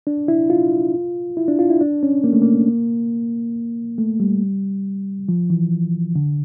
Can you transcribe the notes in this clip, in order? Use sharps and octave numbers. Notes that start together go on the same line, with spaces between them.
D4
E4
F4
E4
D4
F4
E4
D4
C#4
A#3
A3
A#3
A3
G3
F3
E3
D3